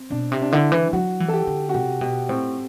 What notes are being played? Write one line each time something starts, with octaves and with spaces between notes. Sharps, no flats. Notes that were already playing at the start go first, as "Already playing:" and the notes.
Already playing: C4
B2 D4
C3
D4
D3 E4
E3
F#3 F#4
E3
A4
G4
D3
F#4
C3 G4
B2 G4
A2 C4